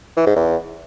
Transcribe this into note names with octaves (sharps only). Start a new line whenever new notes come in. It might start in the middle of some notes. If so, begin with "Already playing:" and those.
E3
G#2
E2